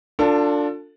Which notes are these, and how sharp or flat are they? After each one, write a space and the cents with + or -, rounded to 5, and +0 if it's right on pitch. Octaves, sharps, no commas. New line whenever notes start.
D4 -5 F4 +15 A4 +30